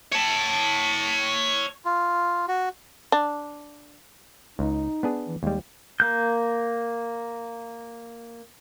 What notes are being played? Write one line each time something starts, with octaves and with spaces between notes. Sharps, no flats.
C#5 A5
F4
F#4
D4
C#2 D#4
B3 D4 G#4
E3
D#2 G3 G#3
A#3 G6